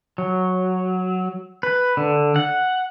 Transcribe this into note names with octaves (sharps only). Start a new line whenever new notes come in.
F#3
B4
D3
F#5